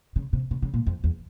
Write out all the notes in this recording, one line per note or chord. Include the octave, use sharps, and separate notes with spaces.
C#3
C3
C#3
C#3
A#2
F2
E2